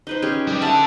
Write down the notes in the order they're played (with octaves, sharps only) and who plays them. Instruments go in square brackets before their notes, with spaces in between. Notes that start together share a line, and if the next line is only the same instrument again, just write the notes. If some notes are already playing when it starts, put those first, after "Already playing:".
[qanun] D#4 B4 C5
C#4 G4 G#4
[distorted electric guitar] G3
[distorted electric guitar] D3 A5 [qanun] E5 F#5